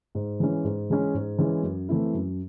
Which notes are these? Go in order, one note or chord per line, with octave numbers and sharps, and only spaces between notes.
G#2
E3 G#3 C#4
G#2
E3 G#3 C#4
G#2
E3 G#3 C#4
F#2
E3 A3 C4 E4
F#2